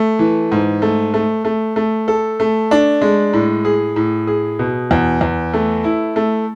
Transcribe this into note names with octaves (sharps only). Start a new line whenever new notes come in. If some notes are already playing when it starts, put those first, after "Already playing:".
Already playing: A3
E3
G#2
A3
A3
A3
A3
A4
A3
D4
G#3
A2
G#4
A2
G#4
B2
E2
E2
A3
E4
A3